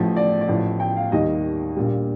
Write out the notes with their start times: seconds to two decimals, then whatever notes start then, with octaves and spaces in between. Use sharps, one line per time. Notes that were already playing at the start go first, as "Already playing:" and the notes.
Already playing: A1 A2 F3
0.16 D5
0.41 D5
0.48 A1 A2 F3
0.80 G5
0.96 F5
1.12 D#2 D#3 G3 D#5
1.77 A#1 A#2 G3